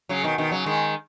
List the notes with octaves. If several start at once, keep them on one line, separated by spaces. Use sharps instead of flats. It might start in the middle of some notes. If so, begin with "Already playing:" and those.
C#3 F#3
B2 D#3
B2 D#3
C#3 F#3
D#3 G#3